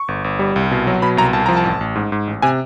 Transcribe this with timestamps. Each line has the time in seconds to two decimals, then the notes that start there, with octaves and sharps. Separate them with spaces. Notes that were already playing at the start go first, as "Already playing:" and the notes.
Already playing: C#6
0.08 G1
0.24 G1
0.39 G3
0.56 C2
0.71 B2
0.87 F#3
1.02 B2 B5
1.17 C2 A#5
1.33 C2 A5
1.46 F3 A#5
1.57 A5
1.64 A1
1.81 A1
1.95 G#2
2.12 G#2
2.27 A1
2.42 C3 G#5